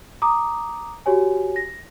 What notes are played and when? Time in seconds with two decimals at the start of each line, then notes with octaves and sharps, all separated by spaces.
0.22 A#5 D6 D#6
1.06 F#4 G4 C#5 G#5
1.56 A#6